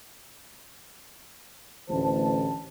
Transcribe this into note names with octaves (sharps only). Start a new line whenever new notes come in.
A1 D2 C5 A5